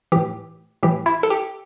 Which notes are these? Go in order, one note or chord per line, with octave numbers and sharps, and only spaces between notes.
A2 E3 G4
A2 E3 G4
E4
A4
G4